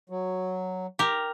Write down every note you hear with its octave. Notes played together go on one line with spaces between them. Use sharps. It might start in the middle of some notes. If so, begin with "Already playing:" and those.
F#3
G4 A#4